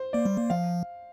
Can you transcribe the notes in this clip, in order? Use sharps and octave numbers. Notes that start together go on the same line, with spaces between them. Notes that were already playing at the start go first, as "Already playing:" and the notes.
Already playing: C5
A#3 D5
G3
A#3
F3 F5